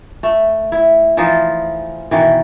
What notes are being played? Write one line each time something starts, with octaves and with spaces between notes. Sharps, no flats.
A3
E4
E3 F3 D#4 F4
B2 D#3 E3